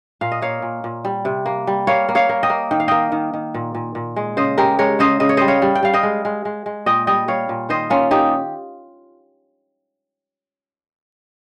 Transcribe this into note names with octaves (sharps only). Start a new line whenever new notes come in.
A#2 F5
D#5
A#3 C#5 F5
A#2
A#2
G3
C3
A#3
G3
A#3 C#5 F5
A#3
C#5 F5
A#3
D#5 G5
A#3
D#3 G5
F5
A#3 D#5 G5
D#3
D#3
A#2
A#2
A#2
G#3
C#3 C5 D#5
G#3 G4 A#4
G#3 A#4 C#5
C#3 C5 D#5
C#3 D#5
C#5
G3 C5 D#5
C#5 F5
G3
G5
G3 F5
D#5 G5
G#3
G#3
G#3
G#3
A#2 D#5 G5
G3 D#5 G5
G3 C#5 F5
A#2
D#3 C5 D#5
A#3 C#4 F4
A#3 D#4 G4